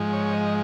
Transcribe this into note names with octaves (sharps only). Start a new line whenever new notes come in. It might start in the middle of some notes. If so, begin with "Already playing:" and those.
Already playing: G#2 F3 G#3
C#5
D#5